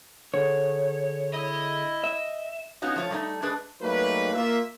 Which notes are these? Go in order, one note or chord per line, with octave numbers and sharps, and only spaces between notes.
D3 G#4 C#5
E4 D#5
E5
B3 C#4 D#4 F4 F#4
F3 A3 F4 C#5
G3 A3 D#4
G#3 D4 G#4 B4
F#3 G3 A3 A#3 D#4 B4
A#3 F4 E5